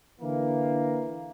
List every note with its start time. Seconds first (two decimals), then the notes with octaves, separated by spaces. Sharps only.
0.21 D3 E3 A#3